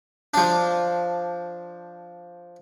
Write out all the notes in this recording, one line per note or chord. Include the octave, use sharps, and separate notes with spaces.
F3 D4